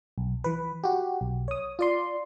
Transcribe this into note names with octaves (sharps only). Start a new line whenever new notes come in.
B1
E3 B4
F#4 G4
B1
C#5 D#6
F4 D5 C6